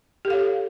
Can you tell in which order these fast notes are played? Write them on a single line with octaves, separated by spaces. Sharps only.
G4 A4 F5 C#5